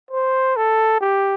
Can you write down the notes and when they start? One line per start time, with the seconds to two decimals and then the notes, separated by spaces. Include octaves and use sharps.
0.11 C5
0.57 A4
1.01 G4